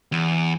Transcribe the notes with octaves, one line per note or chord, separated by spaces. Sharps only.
E2